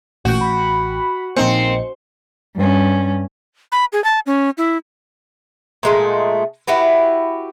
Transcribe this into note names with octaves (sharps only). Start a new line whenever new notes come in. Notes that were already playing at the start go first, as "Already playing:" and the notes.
A1 A#2 F#4 G5
B5
A#1 A#3 C4 D#4 C#7
G2 C#4
B5
G#4
A5
C#4
E4
A#2 G#3 A3
E4 F#4 G4 B4